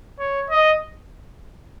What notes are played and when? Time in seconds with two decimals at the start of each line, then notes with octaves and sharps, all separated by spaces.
0.20 C#5
0.50 D#5